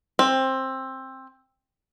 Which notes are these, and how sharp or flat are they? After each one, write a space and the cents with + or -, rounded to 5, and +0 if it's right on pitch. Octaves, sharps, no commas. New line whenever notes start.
C4 +15